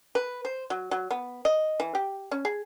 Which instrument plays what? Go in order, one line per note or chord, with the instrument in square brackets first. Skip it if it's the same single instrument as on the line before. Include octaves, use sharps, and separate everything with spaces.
[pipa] B4
C5
F#3
F#3
B3
D#5
E3
G4
C#4
G#4